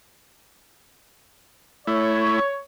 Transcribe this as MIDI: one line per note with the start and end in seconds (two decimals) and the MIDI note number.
1.87 2.39 57
1.87 2.39 64
1.87 2.57 73